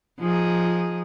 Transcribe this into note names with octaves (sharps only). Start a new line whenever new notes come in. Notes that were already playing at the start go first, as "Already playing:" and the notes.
F3 D#4 G#4